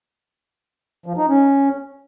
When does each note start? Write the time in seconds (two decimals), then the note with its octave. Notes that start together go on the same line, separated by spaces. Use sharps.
1.06 F3
1.17 D#4
1.28 C#4